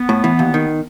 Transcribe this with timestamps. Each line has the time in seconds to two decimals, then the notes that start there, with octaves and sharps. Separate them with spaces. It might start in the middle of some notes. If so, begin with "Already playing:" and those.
Already playing: B3
0.09 A2
0.24 E3
0.39 D#2
0.54 D#3